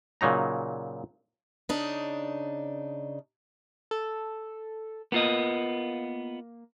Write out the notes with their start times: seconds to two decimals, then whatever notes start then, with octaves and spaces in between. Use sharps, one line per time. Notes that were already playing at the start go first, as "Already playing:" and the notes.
0.21 A#2 C#3 F#3 D#4 A#5
1.69 C#3 D4 D#4
3.91 A4
5.12 A#3 B3 F4 D#5